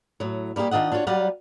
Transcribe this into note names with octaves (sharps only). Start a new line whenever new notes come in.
A2 F#3
G3 A#3 E4 G4 G#4
D#3 D4 F4 D#5 F#5
D4 F4 F#4 B4 C#5
F#3 G3 F4 D5 F5 F#5